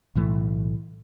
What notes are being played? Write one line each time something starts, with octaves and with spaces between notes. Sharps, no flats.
B1 A2 E3 A3